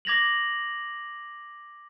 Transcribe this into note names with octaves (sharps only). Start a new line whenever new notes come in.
D6 G#6 A#6 F7 F#7